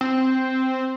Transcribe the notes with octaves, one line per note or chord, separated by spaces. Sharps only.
C4